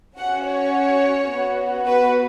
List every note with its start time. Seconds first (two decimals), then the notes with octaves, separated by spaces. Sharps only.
0.17 C#4 F#4 F#5
0.46 C#5
1.30 B3 F#4
1.86 B4